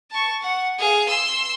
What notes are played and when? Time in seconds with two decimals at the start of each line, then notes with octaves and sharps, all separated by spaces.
0.11 A5 C#6
0.42 F#5
0.78 G#4 F5
1.08 C6 E6